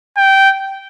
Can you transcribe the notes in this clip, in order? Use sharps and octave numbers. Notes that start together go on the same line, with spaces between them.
G5